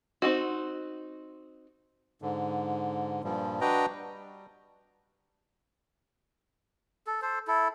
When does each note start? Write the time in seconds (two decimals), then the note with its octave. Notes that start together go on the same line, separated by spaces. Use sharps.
0.22 C4 D#4 F#4
2.22 G#2 D3
3.24 G2 A#2 F3 G3
3.61 D4 F#4 B4 D#5 G5 A#5
3.89 G3
7.07 A4
7.22 A4 C5
7.47 E4 A4